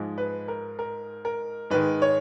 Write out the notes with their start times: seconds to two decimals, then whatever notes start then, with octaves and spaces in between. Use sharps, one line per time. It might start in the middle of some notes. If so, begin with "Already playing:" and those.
Already playing: G#2 F3 G#3
0.18 B4
0.48 A#4
0.79 A#4
1.25 A#4
1.70 G#2 D#3 G#3 B4
2.02 C#5